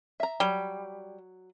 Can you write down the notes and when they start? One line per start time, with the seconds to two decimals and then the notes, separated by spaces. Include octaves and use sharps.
0.20 E5 A#5
0.40 F#3 G3